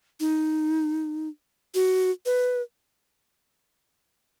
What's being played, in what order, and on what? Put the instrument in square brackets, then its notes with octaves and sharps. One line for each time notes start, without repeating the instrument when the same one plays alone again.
[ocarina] D#4
F#4
B4